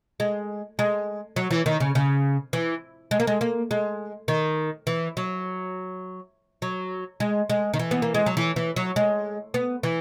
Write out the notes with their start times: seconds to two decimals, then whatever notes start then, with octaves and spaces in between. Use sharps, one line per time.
0.20 G#3
0.79 G#3
1.36 F#3
1.51 E3
1.66 D#3
1.80 C#3
1.95 C#3
2.53 E3
3.11 G#3
3.20 A#3
3.27 G#3
3.41 A#3
3.71 G#3
4.28 D#3
4.87 E3
5.17 F#3
6.62 F#3
7.20 G#3
7.50 G#3
7.74 D#3
7.79 E3
7.91 B3
8.02 A#3
8.14 G#3
8.26 F#3
8.37 E3
8.56 E3
8.76 F#3
8.96 G#3
9.54 B3
9.83 E3